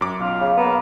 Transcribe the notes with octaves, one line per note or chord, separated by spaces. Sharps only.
F#2 D6
B1 F4
C#3
A#3 B3